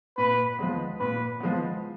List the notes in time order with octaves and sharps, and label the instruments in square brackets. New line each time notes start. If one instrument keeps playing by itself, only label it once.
[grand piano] A#2 [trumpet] B4
[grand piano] F3 G#3 B3
[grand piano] A#2 [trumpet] B4
[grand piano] F3 G#3 B3